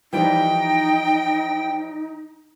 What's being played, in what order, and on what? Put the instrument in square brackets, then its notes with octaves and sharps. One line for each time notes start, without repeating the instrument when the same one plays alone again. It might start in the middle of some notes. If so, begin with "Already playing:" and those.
[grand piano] E3 F3 G3 [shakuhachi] D#4 [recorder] G5